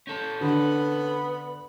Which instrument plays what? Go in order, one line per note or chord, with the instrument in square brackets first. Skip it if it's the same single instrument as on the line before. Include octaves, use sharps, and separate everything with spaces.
[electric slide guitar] C#4 A4 [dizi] G6
[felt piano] D3 [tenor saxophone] B3 [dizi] B5